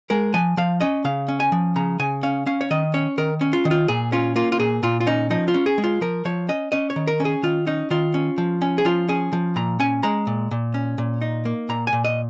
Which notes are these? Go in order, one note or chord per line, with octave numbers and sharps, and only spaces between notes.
G#3 A#4
F3 G#5
F3 F5
C#4 D#5
C#3 F5
C#4
G#5
F3
C#3 A#5
C#3 G#5
C#4 F5
C#4 F5
C#5
D#3 D#5
C#4 C#5
D#3 A#4
C#4
F4
D#3
F4
A#2 G#4
C#4 F4
A#3 F4
F4
A#2 G#4
A#2 F4
F4
C#4 D#4
F3 D#4
F4
C#4
G#4
G#3
F4
F3 A#4
F3 C#5
C#4 D#5
C#4 D#5
C#5
D#3
A#4
C#4
G#4
D#3 F4
C#4 D#4
D#3 F4
C#4
F3
C#4
G#4
F3 F4
C#4 G#4
F3
A#2 A#5
C#4 G#5
G#3 A#5
A#2
A#2
C#4
A#2
D#4
A#3
A#2 A#5
G#5
A#2
D#5